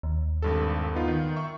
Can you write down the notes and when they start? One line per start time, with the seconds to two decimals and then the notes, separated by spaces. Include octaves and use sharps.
0.03 D#2
0.42 G#1 G2 A4
0.95 B3 D#4 F4
1.08 D#3
1.37 E5 C#6